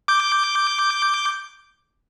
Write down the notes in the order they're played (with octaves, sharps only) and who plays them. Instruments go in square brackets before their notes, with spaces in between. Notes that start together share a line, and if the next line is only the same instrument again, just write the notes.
[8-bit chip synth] D6 G6